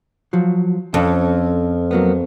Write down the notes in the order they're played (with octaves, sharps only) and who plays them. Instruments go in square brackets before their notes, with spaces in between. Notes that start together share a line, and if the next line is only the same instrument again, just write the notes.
[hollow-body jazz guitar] F3 F#3
[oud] F2 [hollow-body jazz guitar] C#4 A4
[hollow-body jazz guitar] F#3 A#3 B3